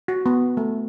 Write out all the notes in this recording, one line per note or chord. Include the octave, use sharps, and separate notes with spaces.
F#4
B3
A3